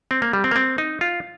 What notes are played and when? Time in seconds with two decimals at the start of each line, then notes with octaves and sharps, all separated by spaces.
0.11 C4
0.22 A#3
0.33 G3
0.44 C4
0.51 A#3
0.56 C4
0.78 D#4
1.01 F4